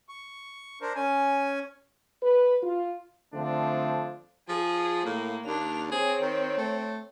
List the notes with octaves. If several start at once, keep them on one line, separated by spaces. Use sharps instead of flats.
C#6
D4 A#4 C5
C#4 G#5
B4
F4
D3 F3 A3 C4 D4
F3 G#4
A2 A#3
D#2 D4 F7
C4 G#4 C#5
D#3
A3